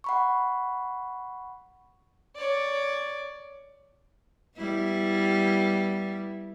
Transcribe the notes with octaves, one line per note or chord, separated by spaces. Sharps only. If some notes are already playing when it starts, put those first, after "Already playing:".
F#5 B5 C#6
C#5 D5
G3 B3 E4